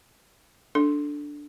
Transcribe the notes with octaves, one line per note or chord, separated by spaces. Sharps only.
D4 A4